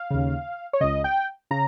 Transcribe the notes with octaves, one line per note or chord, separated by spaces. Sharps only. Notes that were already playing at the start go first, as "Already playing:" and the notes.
Already playing: F5
D#2 C#3
C#5
C#2 C#3 D#5
G5
C#3 A#5